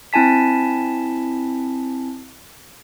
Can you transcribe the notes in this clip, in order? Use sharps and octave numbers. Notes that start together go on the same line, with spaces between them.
C4 E4 G#5 A5 B6